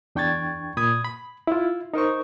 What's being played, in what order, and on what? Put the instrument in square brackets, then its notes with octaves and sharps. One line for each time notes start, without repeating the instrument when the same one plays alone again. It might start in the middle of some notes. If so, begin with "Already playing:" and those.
[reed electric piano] E2 D4 G5 C#6 G#6 A6
A#2 B5 D#6 G#6
B5
E4 F4
D#4 A#4 C5 C#6